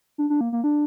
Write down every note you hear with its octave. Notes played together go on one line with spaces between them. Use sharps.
D4
D4
A#3
A#3
D4